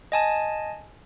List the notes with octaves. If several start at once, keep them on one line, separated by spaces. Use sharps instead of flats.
D#5 G#5 A5